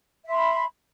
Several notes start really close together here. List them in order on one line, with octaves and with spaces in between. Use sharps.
E5 C6 B5